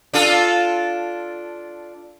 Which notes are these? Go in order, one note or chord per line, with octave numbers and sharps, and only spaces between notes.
D4 F4 A4